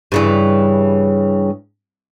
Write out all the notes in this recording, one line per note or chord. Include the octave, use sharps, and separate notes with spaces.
G2 C#3 E3